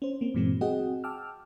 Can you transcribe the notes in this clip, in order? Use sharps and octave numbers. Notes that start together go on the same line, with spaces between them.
C#4 C5
A#3 C4
G2 A#2 E3 F#3 G#3 C4
C4 F#4 G#4 D#5 F#5 G5
G5 A5 D6 E6 F6